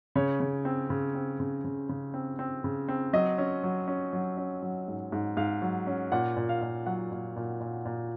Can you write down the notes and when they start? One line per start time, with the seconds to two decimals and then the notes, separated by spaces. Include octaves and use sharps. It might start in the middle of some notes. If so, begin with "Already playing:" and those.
0.15 C#3 C#5
0.40 C#3
0.65 C4
0.90 C#3
1.15 C4
1.40 C#3
1.65 C#3
1.89 C#3
2.14 C4
2.39 C4
2.64 C#3
2.88 C4
3.13 F#3 D#5
3.38 C#4
3.63 F#3
3.88 C#4
4.13 F#3
4.37 C#4
4.62 F#3
4.88 G#2
5.12 G#2
5.37 G#2 F5
5.62 F#3
5.87 C#4
6.12 A#2 F#5
6.37 A#2
6.49 F5
6.62 A#2
6.86 F#3 F#5
7.12 A#2
7.36 A#2
7.60 A#2
7.85 A#2